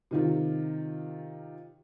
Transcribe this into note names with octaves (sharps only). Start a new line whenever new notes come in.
C3 D#3 F4